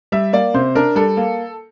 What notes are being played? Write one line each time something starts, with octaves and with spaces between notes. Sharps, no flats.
G3 E5
A#3 D5
C3 C5
D4 A#4
G3 A4
A#3